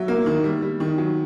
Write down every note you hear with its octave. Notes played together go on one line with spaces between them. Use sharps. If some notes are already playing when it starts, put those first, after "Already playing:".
Already playing: F#3 E5
A#3
D#3
G3
G3
D#3
F#3